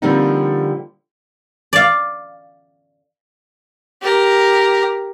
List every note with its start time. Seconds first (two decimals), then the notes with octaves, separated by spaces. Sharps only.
0.02 D3 F3 G3 A#3 C4 D#4
1.73 D5 F5
4.02 G4 A#4